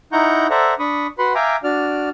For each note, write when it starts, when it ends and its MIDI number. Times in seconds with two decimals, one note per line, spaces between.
0.13 0.47 63
0.13 0.47 64
0.13 0.47 78
0.13 0.47 82
0.13 0.47 85
0.13 0.47 91
0.50 0.74 69
0.50 0.74 72
0.50 0.74 74
0.50 0.74 76
0.50 0.74 78
0.50 0.74 82
0.79 1.07 62
0.79 1.07 83
0.79 1.07 85
0.79 1.07 87
1.18 1.33 66
1.18 1.33 71
1.18 1.33 78
1.18 1.33 83
1.18 1.33 84
1.35 1.56 76
1.35 1.56 77
1.35 1.56 79
1.35 1.56 80
1.35 1.56 82
1.35 1.56 86
1.64 2.09 62
1.64 2.09 66
1.64 2.09 74
1.64 2.09 89